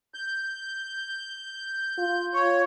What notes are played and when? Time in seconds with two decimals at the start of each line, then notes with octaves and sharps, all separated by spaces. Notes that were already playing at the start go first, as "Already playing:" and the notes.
0.14 G6
1.98 F4
2.34 C#5